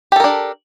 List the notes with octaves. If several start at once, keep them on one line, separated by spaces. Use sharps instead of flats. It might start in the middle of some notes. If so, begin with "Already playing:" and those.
D4 G4 A4 A#4